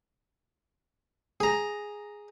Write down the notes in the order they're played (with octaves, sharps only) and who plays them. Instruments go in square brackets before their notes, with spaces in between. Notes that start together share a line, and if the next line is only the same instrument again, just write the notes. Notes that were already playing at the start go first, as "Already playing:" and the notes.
[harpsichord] G#4 A#5